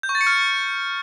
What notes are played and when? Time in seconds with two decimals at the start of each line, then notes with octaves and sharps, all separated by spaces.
0.03 G6
0.09 C#6
0.15 A6
0.21 C#7
0.27 F6